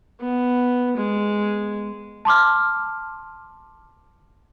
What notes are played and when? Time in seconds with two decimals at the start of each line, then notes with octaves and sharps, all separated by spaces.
0.20 B3
0.97 G#3
2.25 A5 C6 D6 F6